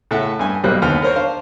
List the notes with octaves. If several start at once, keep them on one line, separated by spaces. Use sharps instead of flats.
A2 C#3 A4 E5 F#5
G2 G#5
B1 G3 A#3 C5 F#6
D#2 D3 B3 F6
A#4 C5 C#5
D4 C5 F5 C6